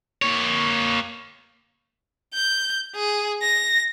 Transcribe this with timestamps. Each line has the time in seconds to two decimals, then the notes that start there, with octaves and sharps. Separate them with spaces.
0.22 A#3 C#5
2.34 G6
2.95 G#4
3.42 A#6